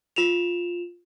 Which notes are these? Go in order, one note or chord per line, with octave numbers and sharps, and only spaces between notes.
F4 E7 F7